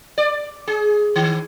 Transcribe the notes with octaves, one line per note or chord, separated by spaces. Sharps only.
D5
G#4
D#3